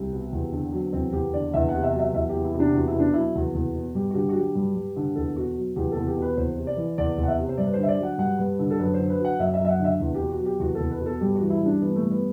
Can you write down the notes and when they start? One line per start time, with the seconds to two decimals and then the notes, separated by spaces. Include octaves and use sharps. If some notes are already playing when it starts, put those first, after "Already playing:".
Already playing: C2 C4
0.12 B2
0.33 E2
0.52 D3
0.72 F#3
0.93 E2 C4
1.13 E2 G4
1.33 D3 D5
1.54 E2 E5
1.69 F#5
1.74 C3
1.83 E5
1.93 F#3
1.99 E5
2.13 E2 E5
2.29 E2 G4
2.45 E4
2.54 C3
2.60 D4
2.74 E2 F#4
2.88 E4
2.95 B2 D4
3.14 F#3 E4
3.35 E2 F#4
3.55 E2
3.75 B2
3.95 G2 G4
4.10 F#4
4.15 D3 G4
4.29 F#4
4.36 F#3 G4
4.55 G2
4.75 G2
4.96 D3
5.16 E2 A4
5.36 B2 F#4
5.57 F#3
5.76 E2 G4
5.92 A4
5.97 E2
6.07 G4
6.17 B2
6.22 B4
6.37 E2 C5
6.57 C3
6.67 D5
6.77 E3
6.98 E2 D5
7.18 E2
7.23 F#5
7.28 E5
7.38 C3
7.49 C5
7.57 G2 D5
7.66 B4
7.73 D3 C5
7.83 E5
7.88 D5
7.99 F#3 F#5
8.18 G2 F#5
8.38 G2 B4
8.59 D3
8.70 A4
8.79 F#2 B4
8.94 D3 C5
9.10 B4
9.19 F#3
9.24 F#5
9.39 F#2 E5
9.54 E5
9.59 F#2
9.65 E5
9.69 F#5
9.79 D3 E5
10.00 E2
10.14 G4
10.20 B2
10.30 F#4
10.39 F#3
10.46 G4
10.60 E2 F#4
10.75 A4
10.80 E2
10.91 B4
11.00 B2
11.06 A4
11.21 G2 G4
11.35 F#4
11.41 E3
11.50 E4
11.61 G2 D4
11.80 E3 B3
11.96 A3
12.02 G2
12.11 B3